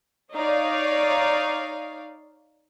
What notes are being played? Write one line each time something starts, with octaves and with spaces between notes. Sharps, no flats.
D#4 C#5 D5 F5